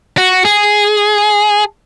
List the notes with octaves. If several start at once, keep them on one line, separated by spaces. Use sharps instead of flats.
F#4
G#4